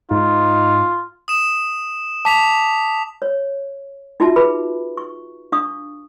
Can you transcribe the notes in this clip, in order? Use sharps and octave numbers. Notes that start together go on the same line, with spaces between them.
G#2 D#4 F4
D#6 E7
A5 D6 B6 F7
C#5
D#4 F4 F#4 E5 A5
G#4 B4 B5
C#6
D4 F5 C#6 D#6